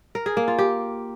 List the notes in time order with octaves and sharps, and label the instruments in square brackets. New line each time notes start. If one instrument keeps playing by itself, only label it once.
[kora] A#4
G#4
A#3
F4
G4